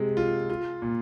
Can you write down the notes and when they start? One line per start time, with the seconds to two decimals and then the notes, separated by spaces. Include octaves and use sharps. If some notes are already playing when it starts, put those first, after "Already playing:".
Already playing: C3 G#3
0.17 F4
0.50 F4
0.82 A#2